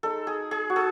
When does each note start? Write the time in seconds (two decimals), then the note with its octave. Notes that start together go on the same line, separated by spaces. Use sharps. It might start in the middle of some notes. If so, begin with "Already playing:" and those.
0.03 G#3 D#4 A4
0.27 G#4
0.51 G#4
0.70 F#4
0.76 G#4